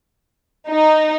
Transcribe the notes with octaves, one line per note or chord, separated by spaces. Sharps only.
D#4